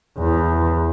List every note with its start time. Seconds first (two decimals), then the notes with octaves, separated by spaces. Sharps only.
0.19 E2